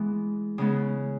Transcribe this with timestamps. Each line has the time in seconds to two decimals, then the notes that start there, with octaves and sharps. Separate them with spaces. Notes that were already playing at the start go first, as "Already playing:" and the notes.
Already playing: E3 G#3 B3
0.58 C#3 G#3 B3